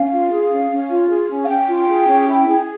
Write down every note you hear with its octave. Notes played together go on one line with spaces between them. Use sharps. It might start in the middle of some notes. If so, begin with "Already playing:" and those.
Already playing: C#4 F5
F4
G#4
C#4
C#4
F4
G#4
C#4
F5
C#4 G5
F4
G#4
C#4
E4
G#4